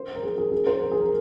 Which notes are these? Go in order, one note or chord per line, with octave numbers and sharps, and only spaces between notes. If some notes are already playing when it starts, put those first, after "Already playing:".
Already playing: C5
A#4
G#4
G#4
G#4
C5
A#4
G#4
A#4